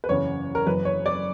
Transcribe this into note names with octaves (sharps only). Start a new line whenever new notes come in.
B4
F#1 E2 C#3 C#5
A#4
F#1 F#2 E3 B4
C#5
D5